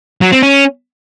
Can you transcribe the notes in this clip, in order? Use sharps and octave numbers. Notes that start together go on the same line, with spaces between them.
F#3
C4
C#4